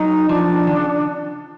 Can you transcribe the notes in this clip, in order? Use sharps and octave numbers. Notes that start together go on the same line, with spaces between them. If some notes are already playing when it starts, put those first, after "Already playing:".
Already playing: F#3 D#4
F3 D4
D#3
C#3